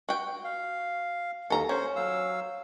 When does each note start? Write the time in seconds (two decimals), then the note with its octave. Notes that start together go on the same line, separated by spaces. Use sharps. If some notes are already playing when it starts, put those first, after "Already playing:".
0.09 F#4 G5
0.44 F5
1.50 D#2 A4 A#5
1.69 C#4 C5
1.96 F#3 F5 E6